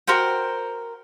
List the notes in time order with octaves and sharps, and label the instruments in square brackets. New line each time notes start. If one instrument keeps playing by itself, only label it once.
[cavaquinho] F#4 A#4 C5 G5